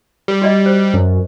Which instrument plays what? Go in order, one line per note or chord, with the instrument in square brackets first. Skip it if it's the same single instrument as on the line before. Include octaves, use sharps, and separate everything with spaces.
[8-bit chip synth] G3
[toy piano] F#4 D5 D#5
C5
[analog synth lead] F#2